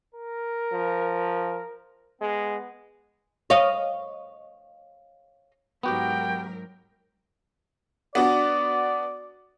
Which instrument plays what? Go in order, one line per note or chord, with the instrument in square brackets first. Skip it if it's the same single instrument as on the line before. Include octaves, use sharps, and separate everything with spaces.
[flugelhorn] A#4
[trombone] F3
[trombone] G#3 [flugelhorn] B3
[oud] C#5 D#5 F5
[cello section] G#2 F#3 A#4 [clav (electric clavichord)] B3 F#4 G4 [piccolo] G5
[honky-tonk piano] B3 D4 F#4 [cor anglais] D5